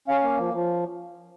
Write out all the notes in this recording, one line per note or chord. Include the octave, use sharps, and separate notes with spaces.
C#4 F5
A#3
F3
F3